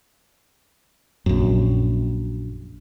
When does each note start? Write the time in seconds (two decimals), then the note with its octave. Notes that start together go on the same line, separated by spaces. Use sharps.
1.26 A#1 F#2